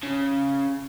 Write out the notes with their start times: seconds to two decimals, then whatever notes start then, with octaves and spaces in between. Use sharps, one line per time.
0.03 C#3